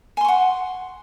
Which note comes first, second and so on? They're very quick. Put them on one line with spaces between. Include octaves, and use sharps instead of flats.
G#5 C6 C#6 F#5